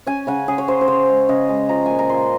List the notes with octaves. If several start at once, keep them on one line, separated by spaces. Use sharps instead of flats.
C#4 G#5
C#3 F#5
C#4 G#4
C#5
C#3 C5
C5
C#3 C#5
G#3
C#3 D#5
G#3
F3 A#5
A#2 G#5
A#5
A#2 C6